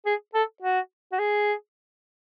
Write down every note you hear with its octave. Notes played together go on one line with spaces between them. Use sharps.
G#4
A4
F#4
F#4
G#4